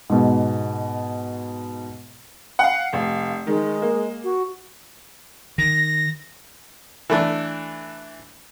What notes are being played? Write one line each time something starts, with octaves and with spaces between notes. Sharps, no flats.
G#2 B2
F5 F#5
F1 F5
D#3 G#3
A#3
F#4
D#3 A#6
E3 A3 D4